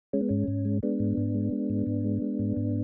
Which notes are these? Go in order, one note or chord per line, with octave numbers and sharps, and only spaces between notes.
G#3 C#4
B3
G#2 C#4
G#2
G#3
G#3 B3 D4
G#2
G#2
G#3
G#3
G#2
G#2
G#3
G#3
G#2
G#2